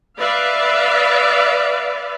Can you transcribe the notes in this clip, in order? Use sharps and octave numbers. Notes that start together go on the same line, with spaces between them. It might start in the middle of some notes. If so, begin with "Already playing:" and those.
B4 D5 E5 F5